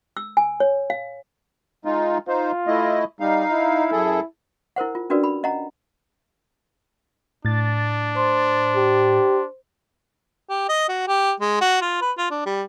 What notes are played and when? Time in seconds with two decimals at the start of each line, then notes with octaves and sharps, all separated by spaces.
0.17 E6
0.37 G#5
0.60 C#5
0.90 F5
1.85 G#3 D#4 F4
2.28 D#4 F4 C5
2.67 A3 E4 D#5
3.20 G3 D#4 F5
3.51 E4
3.92 F#2 G#4 A4
4.76 E4 A#4 C5 F#5
4.95 F4
5.10 C#4 D4 F#4 A#4 B4 D5
5.24 B5
5.43 C#4 D#5 F#5 A#5
7.45 A2 D4 A6
8.15 C5 C6
8.76 G4
10.49 G4
10.69 D#5
10.89 F#4
11.08 G4
11.40 G#3
11.61 F#4
11.81 F4
12.01 B4
12.18 F4
12.30 D4
12.46 G3